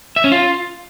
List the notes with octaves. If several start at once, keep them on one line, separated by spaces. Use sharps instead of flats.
E5
C#4
F4